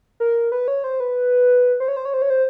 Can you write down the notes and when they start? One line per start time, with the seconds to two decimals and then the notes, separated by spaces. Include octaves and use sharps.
0.20 A#4
0.52 B4
0.68 C#5
0.84 C5
1.00 B4
1.80 C5
1.88 C#5
1.97 C5
2.05 C#5
2.14 C5
2.22 C#5
2.30 C5